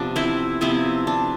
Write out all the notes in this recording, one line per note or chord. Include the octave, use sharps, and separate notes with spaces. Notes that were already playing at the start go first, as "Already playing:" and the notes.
Already playing: C3 F3 B3 D4
C4 E4
C3 F3 B3 C4 E4
D4